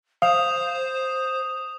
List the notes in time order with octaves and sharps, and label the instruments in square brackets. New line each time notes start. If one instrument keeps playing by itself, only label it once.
[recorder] C5 [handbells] F5 [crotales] D#6 F7